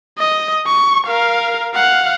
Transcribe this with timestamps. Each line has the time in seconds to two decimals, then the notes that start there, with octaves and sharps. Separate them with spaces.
0.19 D#5
0.67 C#6
1.07 A#4 F5
1.75 F5 F#5